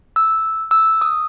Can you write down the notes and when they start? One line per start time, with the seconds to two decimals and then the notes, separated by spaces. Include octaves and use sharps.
0.16 E6
0.71 E6
1.01 D#6